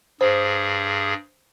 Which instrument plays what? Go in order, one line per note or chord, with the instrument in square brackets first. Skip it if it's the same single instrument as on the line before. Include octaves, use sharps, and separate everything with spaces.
[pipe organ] G2 G#4 [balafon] C5